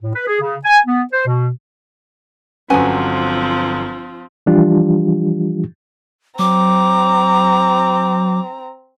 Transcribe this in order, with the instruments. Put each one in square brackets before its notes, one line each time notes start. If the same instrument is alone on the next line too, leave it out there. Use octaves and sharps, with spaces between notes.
[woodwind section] A2
B4
G#4
C#3
G#5
B3
C5
B2
[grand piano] G1 F#3 F#5 [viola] F3 C4 [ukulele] C#4 B4 G#5
[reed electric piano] E3 F3 G3 D4 F4 G4
[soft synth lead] F#3 [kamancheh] C4 A#5 [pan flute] D6